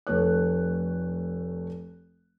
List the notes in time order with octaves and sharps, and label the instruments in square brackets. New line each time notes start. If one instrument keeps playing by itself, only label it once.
[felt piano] F1 A3 C#5 F#6